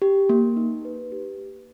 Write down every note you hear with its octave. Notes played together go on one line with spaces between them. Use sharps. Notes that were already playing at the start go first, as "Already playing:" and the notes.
G4
A#3
D#4
B4
G4